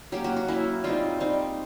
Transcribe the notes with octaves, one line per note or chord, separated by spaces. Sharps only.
F#3 A#3 C#4 G4
F#4
F#4
F#3 A#3 C#4 E4
G3 C4 D#4 F4
G3 C4 D#4